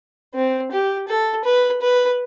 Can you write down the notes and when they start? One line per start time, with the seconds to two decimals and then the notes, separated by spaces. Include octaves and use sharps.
0.34 C4
0.72 G4
1.08 A4
1.45 B4
1.82 B4